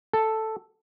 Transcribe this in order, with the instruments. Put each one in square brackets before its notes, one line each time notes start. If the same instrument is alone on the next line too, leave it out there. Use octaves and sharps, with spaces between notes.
[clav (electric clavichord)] A4